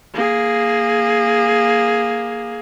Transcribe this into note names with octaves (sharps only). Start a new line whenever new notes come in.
A#3 G#4